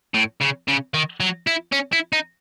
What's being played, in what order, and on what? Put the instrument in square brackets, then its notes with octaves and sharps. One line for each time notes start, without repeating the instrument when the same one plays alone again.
[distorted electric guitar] A2
C#3
C#3
D#3
F#3
E4
C#4
E4
D#4